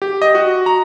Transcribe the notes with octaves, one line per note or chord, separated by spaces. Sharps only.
G4
D#5
F#4
A#5